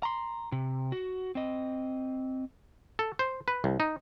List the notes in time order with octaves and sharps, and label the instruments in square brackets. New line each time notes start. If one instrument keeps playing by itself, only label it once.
[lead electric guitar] A#5 C6
C3
F#4
C4 D#5
[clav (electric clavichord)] A4
C5
B4
C2
D#4